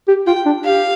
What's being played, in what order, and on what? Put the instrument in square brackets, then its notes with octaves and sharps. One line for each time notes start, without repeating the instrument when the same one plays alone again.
[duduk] G4
[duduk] F4 [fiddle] G5
[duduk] D4
[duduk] G4 [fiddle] F5